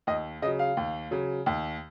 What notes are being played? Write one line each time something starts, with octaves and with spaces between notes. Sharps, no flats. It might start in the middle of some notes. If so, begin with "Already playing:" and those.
D#2 D#5
C#3 F#3 D#5
F5
D#2
C#3 F#3
D#2